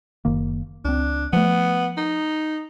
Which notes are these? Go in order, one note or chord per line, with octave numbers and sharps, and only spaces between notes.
F#1 D#3 A#3
C#2 C4 D4
F3 A3 B3
D#4